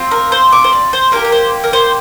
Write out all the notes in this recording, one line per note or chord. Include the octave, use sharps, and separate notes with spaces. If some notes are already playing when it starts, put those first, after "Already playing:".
Already playing: C4 F4
A#4
C5
D6
C5
D5
C5
A#3 G4 A#4
A#4
C5
A#4
C5